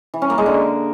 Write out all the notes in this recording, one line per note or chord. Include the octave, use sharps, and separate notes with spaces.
E3
C#4
A#3
G#3
D3